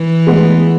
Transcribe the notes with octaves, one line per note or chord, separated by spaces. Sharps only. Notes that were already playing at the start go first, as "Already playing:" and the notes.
Already playing: E3
G#3 B3